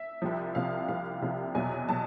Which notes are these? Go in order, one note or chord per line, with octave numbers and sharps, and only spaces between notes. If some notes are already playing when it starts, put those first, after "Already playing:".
Already playing: E5
C2 C3 F3
C2 C3 F3 F5
C2 C3 F3 F5
C2 C3 F3
E2 B2 F#3 G#5
B2 F#3 A5